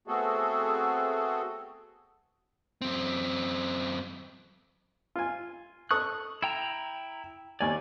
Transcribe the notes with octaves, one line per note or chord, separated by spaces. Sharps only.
A3 B3 C4 F#4 G#4 A4
F#2 C4
F4 G#5
A4 C#6 D#6 F#6
E4 G5 A#5
D#2 D5 G#5